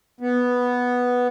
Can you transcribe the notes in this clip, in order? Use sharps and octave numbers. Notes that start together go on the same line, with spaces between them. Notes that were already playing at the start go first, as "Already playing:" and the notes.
B3